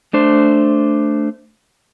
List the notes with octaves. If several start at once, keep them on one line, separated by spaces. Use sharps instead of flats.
A3 D4 C5